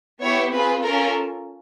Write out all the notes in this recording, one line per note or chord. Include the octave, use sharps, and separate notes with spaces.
B3 E4 G4 C#5
C4 F4 G#4 B4
C#4 F4 A4 A#4